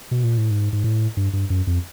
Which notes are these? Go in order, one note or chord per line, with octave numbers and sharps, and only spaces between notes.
B2
A#2
A2
G#2
G#2
A2
G2
G2
F#2
F2